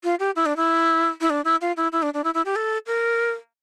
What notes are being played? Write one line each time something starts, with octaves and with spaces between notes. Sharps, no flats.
F4
G4
E4
D4
E4
E4
D4
E4
F4
E4
E4
D4
D4
E4
E4
G4
A4
A#4